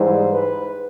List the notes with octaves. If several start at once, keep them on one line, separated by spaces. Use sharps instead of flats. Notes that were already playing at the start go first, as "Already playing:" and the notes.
Already playing: G#2 E3 G3 C5
B4